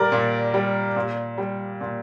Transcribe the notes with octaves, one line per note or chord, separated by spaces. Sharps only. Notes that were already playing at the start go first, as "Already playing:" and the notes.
Already playing: A#2 G3 A#4 D5
A#2
G3
A#2
G3
A#2